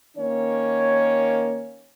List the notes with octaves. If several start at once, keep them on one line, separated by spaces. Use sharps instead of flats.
D#3 A#3 C#4 C#5